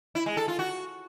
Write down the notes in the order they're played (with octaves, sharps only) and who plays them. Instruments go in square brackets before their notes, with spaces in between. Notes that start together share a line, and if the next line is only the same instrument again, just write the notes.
[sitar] E4
G#3
A4
F4
F#4